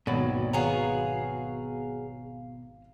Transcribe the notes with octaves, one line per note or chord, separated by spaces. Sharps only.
G#1 D#2 B2 F#3 D5 B5
B3 G#4 C#5 F5 A#5